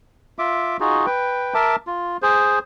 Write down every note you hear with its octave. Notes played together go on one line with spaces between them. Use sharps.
F4 E5 D6
D#4 F4 F#4 G#4
B4 G5
A#4 E5 A5 D6
F4
G#4 C5